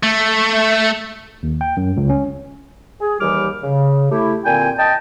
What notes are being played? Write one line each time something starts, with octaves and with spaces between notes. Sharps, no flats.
A3
D#2
G5
F#2
C#2
C#4
G#4
D#2 E3 G3 G4 D6 F6
C#3
A3 E4 G4
A#2 D3 C4 G5 G#5
D#5 G5 A5